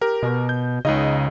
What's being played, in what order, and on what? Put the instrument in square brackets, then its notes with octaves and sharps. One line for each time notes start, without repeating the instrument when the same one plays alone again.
[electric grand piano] G4 A#4
[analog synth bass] B2
[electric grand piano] G6
[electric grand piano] C#2 D#4 D#5 [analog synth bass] C#3